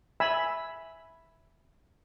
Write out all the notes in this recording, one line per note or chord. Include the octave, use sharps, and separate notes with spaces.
E5 G#5 B5 E6